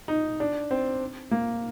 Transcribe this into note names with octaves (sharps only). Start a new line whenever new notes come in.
D#4
D4
C4
A#3